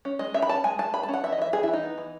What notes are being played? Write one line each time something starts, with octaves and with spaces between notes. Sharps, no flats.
C#4
G#3 D#5
C#4 E5
B5
C#4 A5
G#3 G#5
G#3 A5
G#3 B5
A5
C#4
F#5
E3 E5
D#5
E3 E5
E3 G#4
E3 E4
D#4
B3
E3